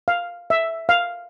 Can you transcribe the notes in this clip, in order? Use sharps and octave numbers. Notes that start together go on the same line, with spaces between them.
F5
E5
F5